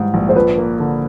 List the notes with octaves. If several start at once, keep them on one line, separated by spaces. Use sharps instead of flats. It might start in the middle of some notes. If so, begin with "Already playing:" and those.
Already playing: G#2 E3 G3
A#1
C5
F3 B4
A#3
D3